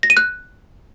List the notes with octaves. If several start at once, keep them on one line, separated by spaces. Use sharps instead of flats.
A#6
D#7
F#6